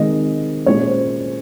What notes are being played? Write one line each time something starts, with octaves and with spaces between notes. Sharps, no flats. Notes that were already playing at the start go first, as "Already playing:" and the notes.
Already playing: D#3 G#3 C4 D#5
A#2 G#3 C#4 C#5
C5